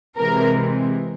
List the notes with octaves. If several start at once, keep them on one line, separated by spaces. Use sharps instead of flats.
C3 E3 G#3 C4 A#4